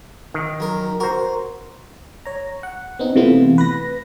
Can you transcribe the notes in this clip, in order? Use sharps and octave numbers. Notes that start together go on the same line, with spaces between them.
D#3
F#2 A#4
F#4 A#4 C5
C#5 A#5
F#5
B3 C4 D#4
C3 E3 A3 B3 F4
B4 B5 A#6